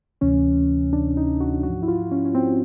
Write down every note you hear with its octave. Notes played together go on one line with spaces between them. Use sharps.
D2 C3 E3 C#4
D4
D#4
F#4
G#2 F3 F#4
E4
F4
C#4
C#4
C4